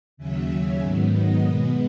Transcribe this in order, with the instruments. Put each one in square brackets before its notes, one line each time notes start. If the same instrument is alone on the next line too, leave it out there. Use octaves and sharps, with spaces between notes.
[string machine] D#2 C#3 F#3 C#4 E5
G#2 D#3 F#3 B3
D#5
B2 G#3 B3